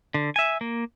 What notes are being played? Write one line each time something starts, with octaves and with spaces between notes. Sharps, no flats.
D3
E5 G#5
A#3